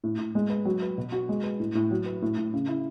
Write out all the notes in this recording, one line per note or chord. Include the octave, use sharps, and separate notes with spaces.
A2
A2
G#3
B4
F#3
B4
B2
F#4
G#3
B4
A2
A2
F#3
B4
A2
A2
C#3
E4